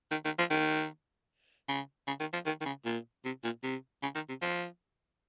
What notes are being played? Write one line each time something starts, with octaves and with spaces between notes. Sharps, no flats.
D#3
D#3
F3
D#3
C#3
C#3
D#3
F3
D#3
D#3
C#3
A#2
C3
A#2
C3
C#3
D#3
C3
F3